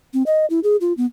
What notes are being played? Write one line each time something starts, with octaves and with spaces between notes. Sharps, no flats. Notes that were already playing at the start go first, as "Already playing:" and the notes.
C4
D#5
E4
G#4
F4
B3